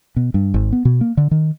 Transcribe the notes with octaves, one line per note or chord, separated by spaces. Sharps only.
B2
G2
G#1
B3
B2
A#3
D3
D#3